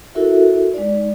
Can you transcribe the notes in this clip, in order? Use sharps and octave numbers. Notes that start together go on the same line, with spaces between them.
E4 F#4 A4 A#4 E5
G#3 D#4 D5